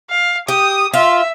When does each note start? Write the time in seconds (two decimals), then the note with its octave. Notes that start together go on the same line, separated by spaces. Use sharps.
0.10 F5
0.48 G4 D#6
0.94 F4 E5